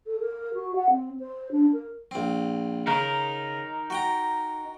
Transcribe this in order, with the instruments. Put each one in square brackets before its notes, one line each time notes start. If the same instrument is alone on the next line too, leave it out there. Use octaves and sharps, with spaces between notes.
[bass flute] A4
A#4
F#4
F#5
C4
C5
D4
A#4
[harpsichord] A#1 C4
[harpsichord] C#3 [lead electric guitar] D#4 A#4
[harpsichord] F#4 G5 A#5